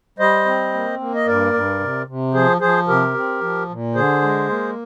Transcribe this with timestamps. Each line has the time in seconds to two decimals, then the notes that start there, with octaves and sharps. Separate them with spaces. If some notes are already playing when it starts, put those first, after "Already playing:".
0.19 G3 C5 D#5
0.45 C4
0.73 A#3
0.99 A#3
1.15 D#5
1.27 G2 A#4 D5
1.53 G2
1.80 C3
2.07 C3
2.34 F3 G#4 C5
2.60 F3 G#4 C5
2.88 C3 G4 A#4
3.14 C4
3.41 F3
3.69 A#2
3.95 D3 G#4 C5
4.22 G#3
4.49 A#3